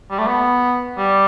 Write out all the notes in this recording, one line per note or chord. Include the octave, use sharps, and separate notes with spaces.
G3
A3
B3
G3